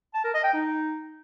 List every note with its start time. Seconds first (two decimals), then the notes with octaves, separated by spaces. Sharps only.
0.14 A5
0.24 A#4
0.34 D#5
0.44 G5
0.54 D#4